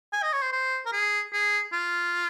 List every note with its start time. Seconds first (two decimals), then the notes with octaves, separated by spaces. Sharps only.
0.13 G#5
0.23 D#5
0.33 C#5
0.42 C5
0.53 C5
0.86 A#4
0.92 G#4
1.33 G#4
1.72 F4